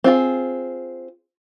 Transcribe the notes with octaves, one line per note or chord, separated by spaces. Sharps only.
C4 F4 G#4